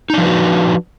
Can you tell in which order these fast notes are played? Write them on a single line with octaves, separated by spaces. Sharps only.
D#4 D4 F3 B4 F#4